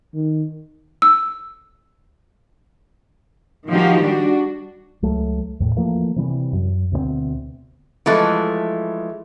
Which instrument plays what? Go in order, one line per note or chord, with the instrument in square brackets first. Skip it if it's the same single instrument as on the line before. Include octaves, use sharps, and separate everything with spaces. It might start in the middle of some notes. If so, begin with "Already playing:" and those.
[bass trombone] D#3
[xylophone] E6
[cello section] D#3 F3 D#4 F#4 G4
G3 D4 F#4
[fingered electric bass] C#2 F#3 A3
E2 A2
E3 F3 A3 A#3
C3 E3 G3
F#2
D2 B2 G#3 C4
[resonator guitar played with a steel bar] E3 F3 G#3 A3